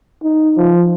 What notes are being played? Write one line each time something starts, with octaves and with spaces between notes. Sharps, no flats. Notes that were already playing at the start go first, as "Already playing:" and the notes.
D#4
F3